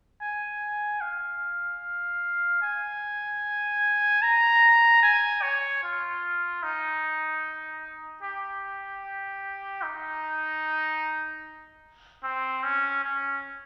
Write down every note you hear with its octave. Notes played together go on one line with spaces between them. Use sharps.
G#5
F5
G#5
A#5
G#5
C#5
F4
D#4
G4
D#4
C4
C#4
C#4